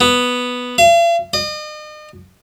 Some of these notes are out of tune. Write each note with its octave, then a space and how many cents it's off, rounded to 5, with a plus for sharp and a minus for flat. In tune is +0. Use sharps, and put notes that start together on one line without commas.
B3 +0
F5 -45
D#5 -40